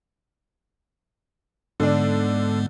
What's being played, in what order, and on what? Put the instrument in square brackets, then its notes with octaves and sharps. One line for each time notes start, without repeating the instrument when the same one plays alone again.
[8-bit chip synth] G#2 G#3 B3 [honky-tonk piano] D3 D4